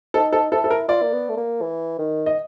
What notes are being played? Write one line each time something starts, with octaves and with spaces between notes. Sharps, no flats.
D#4 A4
A4
E4 A4
A4
A#4
F4 D5
A#3
B3
A3
A#3
E3
D#3
D#5